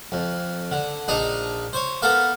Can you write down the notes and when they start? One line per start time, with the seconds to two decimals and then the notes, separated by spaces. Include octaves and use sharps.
0.12 F2
0.72 D3
1.08 A#1 D4 D#4 A#5 D#6
1.73 C5 C#5
2.02 B3 A4 A#4 F5 D6